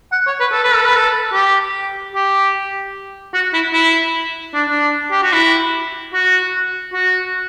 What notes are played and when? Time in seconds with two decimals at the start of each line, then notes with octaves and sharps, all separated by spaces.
0.12 F#5
0.27 C#5
0.40 B4
0.52 A4
0.64 B4
0.75 A4
0.85 B4
0.96 A4
1.33 G4
2.14 G4
3.34 F#4
3.54 E4
3.73 E4
4.54 D4
4.69 D4
5.11 G4
5.23 F#4
5.33 E4
6.14 F#4
6.94 F#4